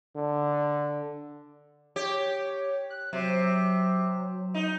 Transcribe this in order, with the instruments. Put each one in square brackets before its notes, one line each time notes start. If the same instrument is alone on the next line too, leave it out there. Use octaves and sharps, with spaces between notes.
[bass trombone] D3
[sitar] G4 [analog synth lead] C#5
[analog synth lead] F#6
[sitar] C3 [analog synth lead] F#3
[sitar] D#4